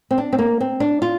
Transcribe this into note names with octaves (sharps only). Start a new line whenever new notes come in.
C4
D4
C4
A#3
C4
D4
F4